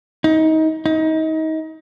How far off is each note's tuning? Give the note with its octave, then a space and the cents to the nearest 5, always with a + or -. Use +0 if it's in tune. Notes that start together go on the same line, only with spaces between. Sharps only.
D#4 +25
D#4 +30